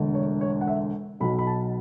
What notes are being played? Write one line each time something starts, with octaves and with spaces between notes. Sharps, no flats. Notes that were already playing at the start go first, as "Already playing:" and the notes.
Already playing: E1 D2 D3
C#5
C#5
F#5
E5
B1 B2 F#3 B5
B5
A5